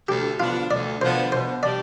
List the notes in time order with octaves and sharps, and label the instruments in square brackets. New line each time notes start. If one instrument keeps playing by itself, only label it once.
[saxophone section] D2 [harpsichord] G4
[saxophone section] D3 F3 B3 D4 [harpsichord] F4
[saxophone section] D2 [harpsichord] D5
[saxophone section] D3 F3 B3 D4 [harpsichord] C5
[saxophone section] B2 [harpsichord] C5
[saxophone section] G3 D4 G4 [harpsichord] D5